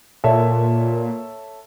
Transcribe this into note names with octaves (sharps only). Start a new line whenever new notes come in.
A#2 A4 C#5 E5